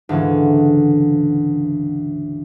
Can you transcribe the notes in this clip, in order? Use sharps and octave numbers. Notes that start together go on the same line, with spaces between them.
D2 G#2 C#3 E3